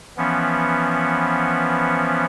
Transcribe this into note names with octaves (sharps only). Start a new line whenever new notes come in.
E3 F3 B3 C#4